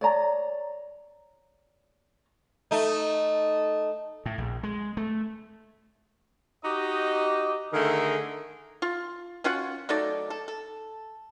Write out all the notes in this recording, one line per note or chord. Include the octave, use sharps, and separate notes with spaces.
C#5 D5 A#5
A3 D#4
A2
A#1
G#3
A3
D#4 F#4 G4 D#5
D3 D#3 A3 G#4 A#4
F4
C#4 F4 F#4 F#5
F#3 A3 D#4 D5
A4
A4